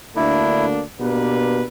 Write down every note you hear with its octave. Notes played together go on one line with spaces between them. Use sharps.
D2 D3 A#3 D4 E4
B2 A#3 D4 G4 B4